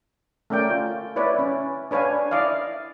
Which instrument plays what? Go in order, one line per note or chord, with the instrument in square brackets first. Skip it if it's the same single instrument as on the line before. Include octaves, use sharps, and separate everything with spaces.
[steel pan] A3 C#4 A#4 D5 G5
F4
E4 B4 C#5 D5
C#4
D4 B4 C#5 F5 G#5
E4 D5 D#5 F5